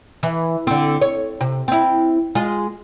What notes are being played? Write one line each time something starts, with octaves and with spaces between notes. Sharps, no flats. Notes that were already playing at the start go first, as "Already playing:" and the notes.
E3
D3 C4
C#5
C3
C4 E4
G#3 F4